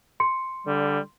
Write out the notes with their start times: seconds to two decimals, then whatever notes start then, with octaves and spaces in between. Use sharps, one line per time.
0.20 C6 C#7
0.67 D3 G3